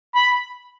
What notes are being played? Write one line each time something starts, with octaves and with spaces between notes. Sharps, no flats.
B5